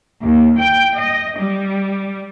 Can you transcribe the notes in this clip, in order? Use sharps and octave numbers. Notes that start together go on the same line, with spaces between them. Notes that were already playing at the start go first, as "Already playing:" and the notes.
D#2
G5
D#5
G3